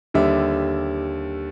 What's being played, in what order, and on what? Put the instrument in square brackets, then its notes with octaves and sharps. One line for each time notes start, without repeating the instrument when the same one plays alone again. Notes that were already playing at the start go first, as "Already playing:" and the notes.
[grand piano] D#2 D3 G3 E5